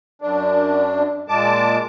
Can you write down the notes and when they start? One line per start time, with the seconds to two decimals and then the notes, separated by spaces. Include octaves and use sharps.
0.22 F#2 D4
1.28 A#2 G#3 A5 D6